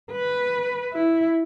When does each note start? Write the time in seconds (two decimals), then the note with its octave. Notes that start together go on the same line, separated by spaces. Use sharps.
0.12 B4
0.94 E4